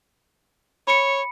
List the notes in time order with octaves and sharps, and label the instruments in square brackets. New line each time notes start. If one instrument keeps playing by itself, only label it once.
[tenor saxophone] C#5 [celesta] B5 C#7